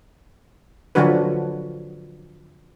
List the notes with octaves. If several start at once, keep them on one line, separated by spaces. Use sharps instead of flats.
D3 F3 F#3 D4 F#4 B4